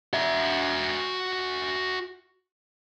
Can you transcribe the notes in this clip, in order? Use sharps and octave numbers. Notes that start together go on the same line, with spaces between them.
F#4 E5